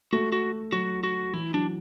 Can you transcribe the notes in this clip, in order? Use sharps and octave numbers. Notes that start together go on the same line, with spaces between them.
A3 F#4
F#4
F#3 F#4
F#4
E3 E4
F#3 D4